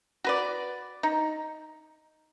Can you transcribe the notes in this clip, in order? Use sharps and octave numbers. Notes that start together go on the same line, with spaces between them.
F#4 B4 D5
D#4